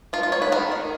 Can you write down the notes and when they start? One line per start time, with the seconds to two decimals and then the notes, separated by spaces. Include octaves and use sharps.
0.13 D#3 F4
0.23 F4
0.32 D#4 C#5
0.42 B4
0.52 D#3 A#4
0.72 D#3